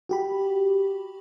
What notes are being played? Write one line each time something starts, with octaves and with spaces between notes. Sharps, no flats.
F#4 G4 B5